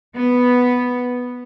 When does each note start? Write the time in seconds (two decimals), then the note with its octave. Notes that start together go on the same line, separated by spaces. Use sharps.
0.16 B3